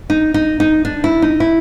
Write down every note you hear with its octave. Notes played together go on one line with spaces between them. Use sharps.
D#4
D#4
D#4
D4
E4
D#4
E4